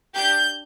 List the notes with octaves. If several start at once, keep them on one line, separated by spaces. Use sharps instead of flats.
D4 G4 G6